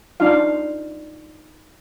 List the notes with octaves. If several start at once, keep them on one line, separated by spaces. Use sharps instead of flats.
D4 D#4 F4 F5